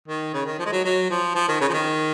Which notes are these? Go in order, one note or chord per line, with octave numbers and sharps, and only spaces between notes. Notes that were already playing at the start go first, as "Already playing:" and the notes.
D#3
C#3
D#3
F3
G#3
F#3
F#3
F3
F3
D#3
C#3
F3
D#3